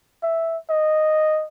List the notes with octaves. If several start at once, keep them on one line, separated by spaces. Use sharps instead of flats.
E5
D#5